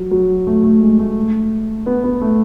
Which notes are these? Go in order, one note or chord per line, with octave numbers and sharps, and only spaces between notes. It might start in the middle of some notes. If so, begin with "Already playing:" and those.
Already playing: F#3
F#3
A3
A3
G#3
A3
B3
B3
A3